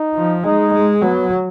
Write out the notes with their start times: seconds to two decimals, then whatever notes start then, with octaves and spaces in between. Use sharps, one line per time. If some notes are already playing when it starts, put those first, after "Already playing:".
Already playing: D#4
0.15 F3
0.43 G#3 D#4
0.73 G#3
1.02 F#3 B3